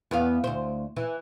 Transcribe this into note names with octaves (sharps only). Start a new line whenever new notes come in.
E2 B3 F5
D2 C5
E3